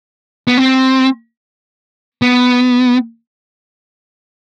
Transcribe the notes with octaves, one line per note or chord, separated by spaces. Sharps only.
B3
C4
B3